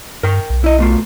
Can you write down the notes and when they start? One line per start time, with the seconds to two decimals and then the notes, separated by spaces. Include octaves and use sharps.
0.23 G2 A#4 G5
0.50 B1
0.64 E4 D#5
0.78 B2 A3 F4